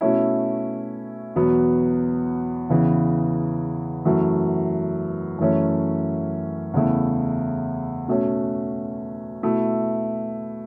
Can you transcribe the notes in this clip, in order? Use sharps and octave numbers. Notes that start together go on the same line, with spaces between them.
B2 A3 C#4 E4
E2 B2 F#3 B3
E2 C#3 E3
F#2 E3 A3
F#2 E3 A3 C#4
E2 C#3 A3 E4
B2 A3 C#4
B2 A3 E4